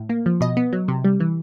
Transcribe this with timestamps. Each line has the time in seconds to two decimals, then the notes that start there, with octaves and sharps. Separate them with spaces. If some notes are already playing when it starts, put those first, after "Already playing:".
Already playing: A2
0.09 A#3
0.26 F3
0.41 B2 D#5
0.57 B3
0.73 F#3
0.88 C3
1.05 G3
1.20 E3